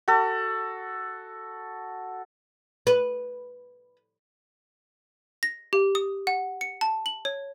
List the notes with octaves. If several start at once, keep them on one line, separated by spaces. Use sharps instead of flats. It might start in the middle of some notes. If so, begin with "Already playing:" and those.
F#4 A4
B4
A#6
G4
D#6
F#5
C#7
A5
F#7
C#5